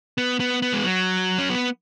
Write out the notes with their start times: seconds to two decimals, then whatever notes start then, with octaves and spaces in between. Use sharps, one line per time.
0.18 B3
0.40 B3
0.62 B3
0.73 G#3
0.84 F#3
1.38 C#4
1.50 B3